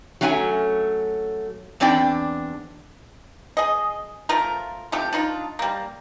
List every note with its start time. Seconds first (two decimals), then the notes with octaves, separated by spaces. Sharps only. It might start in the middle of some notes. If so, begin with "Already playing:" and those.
0.21 F#3 A3 C#4 F5 G#5
1.80 E2 C4 D4 D5 G5
3.57 G#4 D#5
4.29 F3 A3 F4 A#4
4.92 C3 F3 A3 G4
5.13 D4 D#4 F4
5.59 G3 A#3